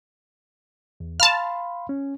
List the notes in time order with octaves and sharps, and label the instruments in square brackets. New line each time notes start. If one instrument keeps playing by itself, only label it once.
[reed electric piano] E2
[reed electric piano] F5 B5 C6 [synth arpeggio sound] A5 F6
[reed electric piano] C#4